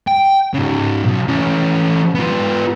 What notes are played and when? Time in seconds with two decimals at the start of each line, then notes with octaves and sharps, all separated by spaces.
0.07 G5
0.54 G#2 C#3
1.06 B1
1.28 E3 C#4
2.15 B3 F4